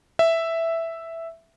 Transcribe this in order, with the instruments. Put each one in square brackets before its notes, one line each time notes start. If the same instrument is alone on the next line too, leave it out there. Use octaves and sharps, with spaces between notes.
[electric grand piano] E5